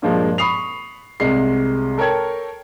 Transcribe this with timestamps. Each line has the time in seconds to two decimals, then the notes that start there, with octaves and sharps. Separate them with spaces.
0.02 G2 A#2 F3 G#3 A#3
0.38 B5 C#6 D#6 C7 F7
1.20 C2 C3 G#3 C7
1.98 A4 A#4 C#5 G5 G#6